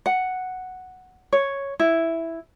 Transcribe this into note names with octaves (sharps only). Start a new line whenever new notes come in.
F#5
C#5
E4